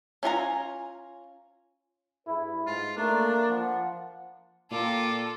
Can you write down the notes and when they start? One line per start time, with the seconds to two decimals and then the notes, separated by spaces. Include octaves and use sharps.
0.23 C#4 F4 G#5 A#5
2.27 G2 E4 G#4 B4
2.67 G#2 F4
2.97 A3 A#3 D4 D5 A#5
3.49 F3 F#5
4.71 A#2 F4 A4 A#4 G5 D6